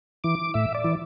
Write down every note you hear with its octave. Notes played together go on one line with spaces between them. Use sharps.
E3 D6
A2 E5
D5
E3